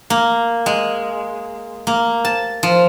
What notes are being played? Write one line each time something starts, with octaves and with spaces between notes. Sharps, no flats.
A#3
G#3
A#3
A5
F3